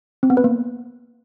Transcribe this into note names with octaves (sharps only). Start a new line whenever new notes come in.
C4
B3
B4
A#3